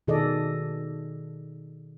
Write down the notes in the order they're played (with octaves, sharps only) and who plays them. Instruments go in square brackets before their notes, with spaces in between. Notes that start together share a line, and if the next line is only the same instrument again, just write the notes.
[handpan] B2 D#3 G#4 A4 D5 D#5